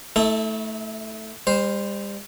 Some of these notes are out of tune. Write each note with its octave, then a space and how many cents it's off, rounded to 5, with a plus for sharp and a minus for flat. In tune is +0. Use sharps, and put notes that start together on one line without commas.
A3 +0 E4 -40 A4 +0
G3 +40 C5 +0